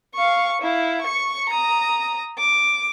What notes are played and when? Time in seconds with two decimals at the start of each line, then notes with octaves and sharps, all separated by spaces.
0.15 F5 C#6
0.61 E4 F5
1.02 C#6 C#7
1.49 A#5 D#6
2.38 D6